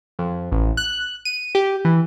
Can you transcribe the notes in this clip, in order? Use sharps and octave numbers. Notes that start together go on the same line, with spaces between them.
F2
A1
F#6
D#7
G4
E3